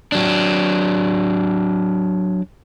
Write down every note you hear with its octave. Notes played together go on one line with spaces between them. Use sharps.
F#3 D4